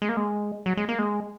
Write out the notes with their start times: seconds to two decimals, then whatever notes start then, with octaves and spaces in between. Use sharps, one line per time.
0.02 G#3
0.09 A#3
0.17 G#3
0.66 F#3
0.77 G#3
0.89 A#3
0.99 G#3